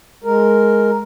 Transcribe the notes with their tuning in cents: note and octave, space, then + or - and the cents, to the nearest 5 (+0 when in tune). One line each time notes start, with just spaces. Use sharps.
G#3 +10 A#4 +0